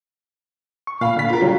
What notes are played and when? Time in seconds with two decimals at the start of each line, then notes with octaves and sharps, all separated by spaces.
0.87 C#6
1.01 A#2 F5 B5
1.16 D3 F5 B6
1.29 F4 A#4
1.41 D3 F#3 G3